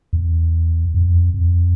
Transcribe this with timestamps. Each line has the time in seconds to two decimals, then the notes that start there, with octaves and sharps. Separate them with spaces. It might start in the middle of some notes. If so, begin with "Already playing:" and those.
0.13 E2
0.94 F2
1.34 F2